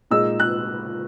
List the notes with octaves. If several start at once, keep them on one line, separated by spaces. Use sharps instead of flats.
A#2 G#3 D#4 E6
F#6